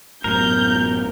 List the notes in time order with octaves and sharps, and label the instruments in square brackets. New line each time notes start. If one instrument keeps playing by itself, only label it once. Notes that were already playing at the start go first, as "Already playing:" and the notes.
[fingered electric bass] A1 F#2 A2 [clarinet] B3 [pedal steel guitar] A#4 [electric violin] G6